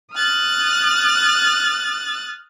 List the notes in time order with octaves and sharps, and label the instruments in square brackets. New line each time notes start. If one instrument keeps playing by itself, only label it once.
[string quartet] D#6 F6 F#6 A6